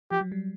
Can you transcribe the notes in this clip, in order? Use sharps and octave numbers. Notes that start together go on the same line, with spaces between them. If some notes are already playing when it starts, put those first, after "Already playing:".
F3 G4
F#3
G3